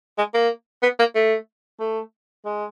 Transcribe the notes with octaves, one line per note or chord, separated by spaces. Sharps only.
G#3
A#3
B3
A#3
A3
A3
G#3